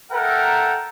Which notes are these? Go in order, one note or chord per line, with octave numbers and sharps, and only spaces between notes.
A4 A#4 E5 F#5 G5 A#5